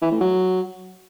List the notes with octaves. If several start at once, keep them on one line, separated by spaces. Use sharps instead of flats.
E3
A2
F#3